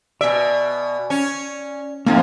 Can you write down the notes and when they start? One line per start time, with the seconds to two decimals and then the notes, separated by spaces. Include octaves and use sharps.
0.21 B2 D5 E5 G#5
1.10 C#4
2.06 F2 A2 F3 A#3 D#4